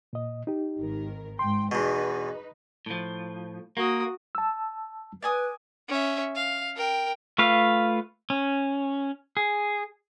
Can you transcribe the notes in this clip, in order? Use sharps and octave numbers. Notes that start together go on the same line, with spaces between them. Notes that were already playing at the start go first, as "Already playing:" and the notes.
A#2 D#5
D#4 G4
G#1 D#3 A#4
G#2 G5 C6
E2 B2 D#4 B4 D#5
A2 F3
A#3 F#4 D#6
A5 E6
B4 D5 G#5 D#6
C#4 E5
F5
A#4 G5
A3 F4 B4 F5
C#4
G#4